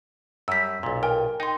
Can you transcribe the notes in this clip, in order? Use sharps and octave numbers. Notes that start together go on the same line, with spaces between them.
F#2 G3 E6 B6
B1 A#2
A#4 G5 G#5
D#4 G5 C6